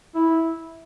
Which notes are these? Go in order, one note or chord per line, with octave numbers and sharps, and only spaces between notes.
E4